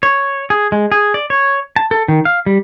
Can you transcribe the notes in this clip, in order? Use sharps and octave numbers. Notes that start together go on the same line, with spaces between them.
C#5
G#4
G#3
G#4
D5
C#5
A5
A4
D#3
F5
G3